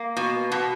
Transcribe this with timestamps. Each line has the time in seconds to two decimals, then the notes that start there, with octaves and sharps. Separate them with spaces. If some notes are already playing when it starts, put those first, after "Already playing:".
Already playing: A#3
0.17 B2
0.52 B2